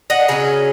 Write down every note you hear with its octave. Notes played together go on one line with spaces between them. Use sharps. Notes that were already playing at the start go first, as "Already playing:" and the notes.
D#5 F#5
C#3 F#3 C#4 G#4